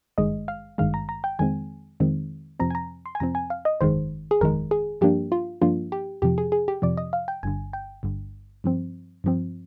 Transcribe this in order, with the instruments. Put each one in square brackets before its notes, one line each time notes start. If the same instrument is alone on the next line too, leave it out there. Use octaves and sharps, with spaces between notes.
[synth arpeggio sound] G#1 G2 D#3 G#3 D#5
F5
G#1 G2 D#3 G#3 F5
A#5
A#5
G5
F2 D#3 G#3 C4 G#5
F2 D#3 G#3 C4
F2 C3 F3 C4 A#5
G#5
A#5
C6
G#5
F2 C3 F3 C4 A#5
G#5
F5
D#5
G1 F2 D#3 G#3 C5
G#4
G1 F2 D#3 G#3 A#4
G#4
G2 F3 A#3 D4 G4
F4
G2 F3 A#3 D4 F4
G4
F2 C3 F3 G4
G#4
G#4
G4
F2 C3 F3 D5
D#5
F5
G5
G1 G2 D3 G#5
G5
G1 G2 D3
G2 F3 C4
G2 F3 C4